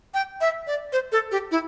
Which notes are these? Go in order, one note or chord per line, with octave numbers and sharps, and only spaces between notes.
G5
E5
D5
C5
A4
G4
E4